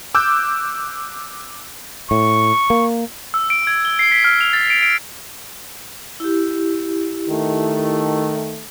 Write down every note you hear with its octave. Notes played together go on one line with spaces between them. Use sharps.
D6 E6 F#6 G6
A2 C#6
A#3
E6
D7
G#6
G7
C7
B6
F6
F7
A6
D7
D7
E4 G4
D#3 A3